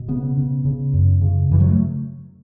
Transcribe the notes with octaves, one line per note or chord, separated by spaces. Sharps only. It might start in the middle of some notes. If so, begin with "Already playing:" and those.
Already playing: B2
C#3 B3
C#3
C#3
F#2
C#3
F#2 E3
F#3
A3